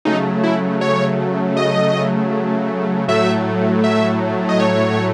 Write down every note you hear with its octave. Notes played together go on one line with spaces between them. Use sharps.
C#3 F#3 A3 D#4
E4
C#5
D#5
A2 F#3 A3 E5
E5
D#5
C#5